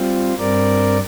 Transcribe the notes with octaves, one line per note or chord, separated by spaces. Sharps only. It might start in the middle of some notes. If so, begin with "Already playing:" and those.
Already playing: G3 C4 F4
G2 G3 C4 A#4 D5